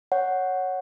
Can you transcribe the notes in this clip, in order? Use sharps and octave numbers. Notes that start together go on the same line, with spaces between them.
C#5 F#5